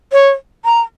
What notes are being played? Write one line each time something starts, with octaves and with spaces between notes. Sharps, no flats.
C#5
A#5